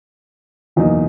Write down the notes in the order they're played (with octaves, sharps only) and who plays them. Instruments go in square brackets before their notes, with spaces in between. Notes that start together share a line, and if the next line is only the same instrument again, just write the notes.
[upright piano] F#1 E2 B2 A#3 D#4